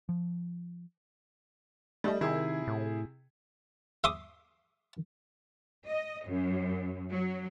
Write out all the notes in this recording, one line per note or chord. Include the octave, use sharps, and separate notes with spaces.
F3
G3 A3 D#5
C3 D#3 E4 G#4
A2
E5 C6 D6 D#6
D#5
F#2
F#3